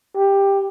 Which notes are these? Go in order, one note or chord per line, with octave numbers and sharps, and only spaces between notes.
G4